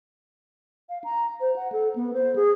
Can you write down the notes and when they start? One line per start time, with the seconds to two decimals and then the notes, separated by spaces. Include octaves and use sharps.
0.89 F5
1.04 A#5
1.40 C5
1.56 F#5
1.72 A4
1.96 B3
2.14 C5
2.36 G#4